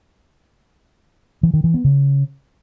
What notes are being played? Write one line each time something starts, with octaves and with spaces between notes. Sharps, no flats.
E3
D#3
E3
B3
C#3